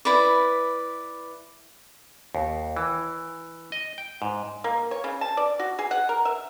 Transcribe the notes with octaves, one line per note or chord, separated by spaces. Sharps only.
E4 B4 D5
D#2
E3
D#5
G5
G#2
A#3
C#5
C#3
A5
D5
F#4
G#4
F#5
A#4
E5